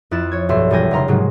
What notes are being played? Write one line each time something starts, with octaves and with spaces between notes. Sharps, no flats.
F2 E4 F#6 A6 E7
C#5 G#6
B1 G2 E5 G5 C6
E1 E2 G3 G5 G#5 A#6
F1 C#3 F5 A#5 C6
G#2 C3 F3 F#3 G#3 A#3